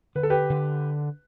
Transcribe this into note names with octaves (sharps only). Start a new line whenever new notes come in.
D3 B4
A4
G4 B4
D3